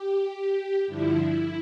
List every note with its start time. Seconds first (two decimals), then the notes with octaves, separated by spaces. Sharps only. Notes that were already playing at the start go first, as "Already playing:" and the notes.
Already playing: G4
0.86 G2 D3 F3 E4